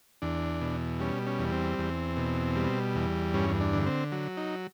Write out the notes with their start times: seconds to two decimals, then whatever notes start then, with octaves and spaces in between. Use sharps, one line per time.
0.22 E2 D4
0.61 B2
1.00 G3 C#4
1.26 C#4
1.39 E2
1.52 C4
1.78 E2
2.17 B2
2.56 G3
2.95 E2
3.34 G2 C#4
3.60 D4
3.73 D3
3.86 C4
4.12 F#3
4.37 D#4